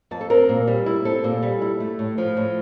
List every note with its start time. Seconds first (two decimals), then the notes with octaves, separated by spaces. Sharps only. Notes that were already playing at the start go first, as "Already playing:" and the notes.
0.11 F2 A5
0.21 A4
0.30 C4 A#4
0.49 A#2
0.68 G3
0.86 E4
1.05 C4 A4
1.24 A#2
1.43 G3
1.62 E4
1.80 A3
1.99 A2
2.18 F3
2.37 A2